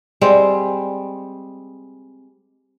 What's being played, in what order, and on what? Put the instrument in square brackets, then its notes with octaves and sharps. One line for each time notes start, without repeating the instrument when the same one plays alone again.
[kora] G3 G#3 C4